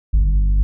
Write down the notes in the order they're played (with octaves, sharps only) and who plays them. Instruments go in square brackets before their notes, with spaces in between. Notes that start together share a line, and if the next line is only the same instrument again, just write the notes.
[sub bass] G1